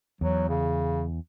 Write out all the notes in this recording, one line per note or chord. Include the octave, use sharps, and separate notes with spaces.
E2 F#3
C#3